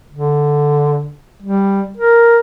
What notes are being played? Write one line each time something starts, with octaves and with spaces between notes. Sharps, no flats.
D3
G3
A#4